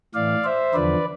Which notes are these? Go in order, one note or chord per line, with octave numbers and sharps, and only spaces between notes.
A2 E3 D5 F5
C5 E5
E2 D3 F3 B4 D5